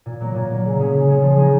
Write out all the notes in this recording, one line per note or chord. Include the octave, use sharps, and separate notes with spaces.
A#2
F#3 A#3
A#2
F#3 A#3
C#3
G#3 C#4 G#4 C#5
C#3
G#3 C#4 G#4 C#5
F3
A#3 D#4 G#4